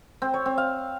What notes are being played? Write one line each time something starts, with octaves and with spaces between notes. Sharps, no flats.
C4
C#5
C4
F5